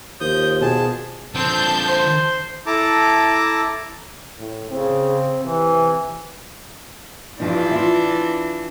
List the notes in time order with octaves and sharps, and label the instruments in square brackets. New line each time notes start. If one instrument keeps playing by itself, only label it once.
[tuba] D#2 [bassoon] F3 [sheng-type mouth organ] D#6 G6
[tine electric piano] B2 [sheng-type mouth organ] G#4 A5
[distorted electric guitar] D3 F3 [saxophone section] C4 [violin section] A5 G6
[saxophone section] C5
[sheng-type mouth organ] E4 A4 A5 A#5 D6
[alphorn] A2
[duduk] C#3 [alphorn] C4
[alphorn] C3 [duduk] E3
[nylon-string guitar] G2 F3 D#4 [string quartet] E3 D4
[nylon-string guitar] F4 E5